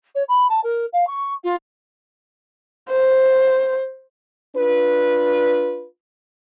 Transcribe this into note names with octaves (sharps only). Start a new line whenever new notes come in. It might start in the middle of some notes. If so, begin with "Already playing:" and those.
C#5
B5
A5
A#4
F5
C#6
F4
C5
D4 F4 B4